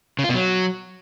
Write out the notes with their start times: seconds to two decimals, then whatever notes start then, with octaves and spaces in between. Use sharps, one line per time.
0.19 C#3
0.24 F4
0.29 B2
0.34 F#3